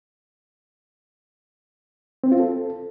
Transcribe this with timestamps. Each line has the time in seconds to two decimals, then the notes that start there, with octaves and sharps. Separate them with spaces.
2.24 C4
2.32 F4
2.40 A4